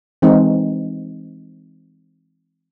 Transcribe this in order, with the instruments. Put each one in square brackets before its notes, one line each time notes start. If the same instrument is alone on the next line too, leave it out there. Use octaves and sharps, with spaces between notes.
[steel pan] E3 G#3 C4 D#4